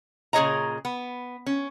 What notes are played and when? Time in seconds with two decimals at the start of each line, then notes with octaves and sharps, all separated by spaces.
0.33 A#2 C#3 G#4 C#5 D#5 A#5
0.85 B3
1.46 C#4